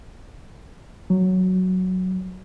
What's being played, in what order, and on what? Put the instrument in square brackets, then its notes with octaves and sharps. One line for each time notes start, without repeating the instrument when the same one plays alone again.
[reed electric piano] F#3